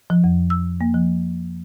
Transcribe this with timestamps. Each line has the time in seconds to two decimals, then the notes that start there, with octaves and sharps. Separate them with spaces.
0.10 F3
0.24 F2
0.50 E6
0.81 A#3
0.94 F3